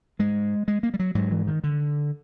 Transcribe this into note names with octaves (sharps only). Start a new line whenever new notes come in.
G#2 G#3
G#3
A#3
G3
F#3
G#2 F#3
E3
D#3
D3